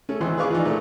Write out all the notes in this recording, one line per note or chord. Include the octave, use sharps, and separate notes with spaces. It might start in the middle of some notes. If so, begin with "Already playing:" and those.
A3 C#4
G#1 E3 C6
G#4 B4 D5 F5 C#6 D6
E3 F3 D#4
A#2 A3